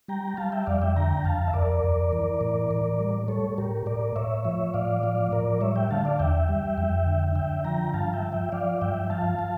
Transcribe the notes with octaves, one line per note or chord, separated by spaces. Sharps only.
G3 G5 A#5
G3 F5 A5
E5 G5
F2 D5 F5
E5 G5
D3 G5 A#5
F2 F5 A5
E5
F2 A#4 D5
F2
E3
A2
A2
G3
G3 A4 C#5
A2 G4 A#4
A2 A#4 D5
A2 C#5 E5
F3 C#5 E5
A2 D5 F5
F3 D5 F5
A2 A#4 D5
G3 C#5 E5
E5 G5
D3 F5 A5
D5 F5
E2 E5 G5
G3
F2
D3
D3 E5 G5
F3 G5 A#5
G2 F5 A5
E5 G5
F3
E5 G5
F3 D5 F5
G2 E5 G5
F3 F5 A5
F3